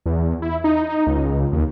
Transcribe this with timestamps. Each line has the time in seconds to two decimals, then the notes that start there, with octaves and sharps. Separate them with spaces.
0.06 E2
0.42 E4
0.64 D#4
0.89 D#4
1.07 C#2
1.52 D#2